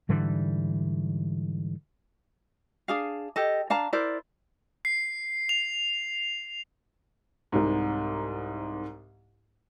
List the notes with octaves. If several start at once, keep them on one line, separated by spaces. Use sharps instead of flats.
G#2 D3 E3 G3
D4 G#4 F5
G4 A4 D#5
D4 F5 A5 A#5
E4 A#4 C5 D5
C7
F7
C2 G#2